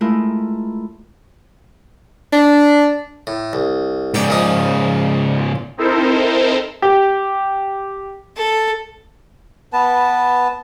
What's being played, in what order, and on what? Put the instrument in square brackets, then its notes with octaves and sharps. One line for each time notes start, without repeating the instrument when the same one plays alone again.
[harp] G#3 A3 E4 F4 A#4
[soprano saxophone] D4
[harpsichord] A2
C2
[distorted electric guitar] G#2 C#3 [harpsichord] D5 G5
[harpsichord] A#2 F3 D#4
[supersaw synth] C4 D#4 E4 A4 A#4 C5
[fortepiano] G4
[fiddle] A4
[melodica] B3 B4 A5